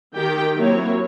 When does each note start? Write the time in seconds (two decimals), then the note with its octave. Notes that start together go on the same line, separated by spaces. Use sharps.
0.16 D#3 G4 G5
0.55 F#3 A#3 C4 E4 A#4 C#5